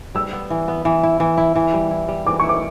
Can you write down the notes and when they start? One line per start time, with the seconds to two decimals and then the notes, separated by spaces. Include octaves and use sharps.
0.15 G3 E6
0.33 B3
0.50 E3
0.68 B3
0.85 E3
1.03 E4
1.20 E3
1.38 E4
1.55 E3
1.74 G3
1.91 E4
2.08 G3
2.27 E3 D6
2.40 E4 C#6
2.49 D6